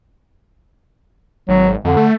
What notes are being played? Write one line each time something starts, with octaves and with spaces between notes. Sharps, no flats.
G#1 F#3
F2 D3
A3